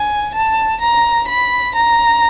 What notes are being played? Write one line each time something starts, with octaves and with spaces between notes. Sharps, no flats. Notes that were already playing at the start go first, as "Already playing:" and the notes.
Already playing: G#5
A5
A#5
B5
A#5